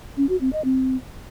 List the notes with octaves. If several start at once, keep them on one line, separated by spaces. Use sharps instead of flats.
C#4
F#4
C4
D#5
C4